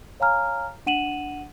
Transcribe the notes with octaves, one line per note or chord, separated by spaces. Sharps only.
C#5 F5 G#5 A#5 F6
D4 F#5 D#7 E7 F#7